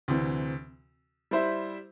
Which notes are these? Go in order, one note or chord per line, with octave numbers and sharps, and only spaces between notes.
D2 C3 E3 C4
G3 E4 C5 E5